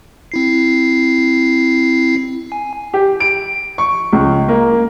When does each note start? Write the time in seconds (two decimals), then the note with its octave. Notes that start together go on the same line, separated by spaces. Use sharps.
0.32 C4 E4 C7
2.52 G#5
2.94 G4
3.20 D7
3.78 C#6
4.13 C#2
4.48 A#3